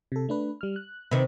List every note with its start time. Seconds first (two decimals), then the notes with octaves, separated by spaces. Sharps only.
0.12 C3 A4
0.29 A3 D4 B4
0.61 G3 F6
0.76 F#6
1.11 C3 D#3 B4